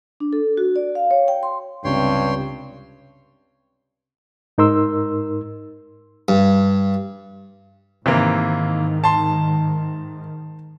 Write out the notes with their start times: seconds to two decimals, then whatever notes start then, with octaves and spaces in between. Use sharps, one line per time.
0.20 D4
0.33 A4
0.57 F#4
0.76 D5
0.95 F5
1.11 C#5
1.28 G5
1.43 C6
1.85 C#2 G2 C3 C#5 G5 C6
4.58 G#2 D#4 A#4 C6 E6
6.28 G2
8.06 G#2 C3 D#3 E3 A#3
9.04 A5 C6